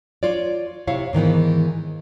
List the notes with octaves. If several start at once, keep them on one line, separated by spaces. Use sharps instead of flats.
F4 C#5 D5
C3 E4 C#5 F5
G#2 D#3 E3 B3